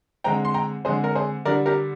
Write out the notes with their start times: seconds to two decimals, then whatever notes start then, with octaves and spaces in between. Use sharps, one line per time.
0.24 D3 G#3 C4 G5 A#5
0.45 C6
0.54 G5 A#5
0.85 D3 G#3 C4 G#4 C5
1.04 A#4
1.15 G#4 C5
1.45 D3 G3 D4 A#4 D5
1.66 G4 A#4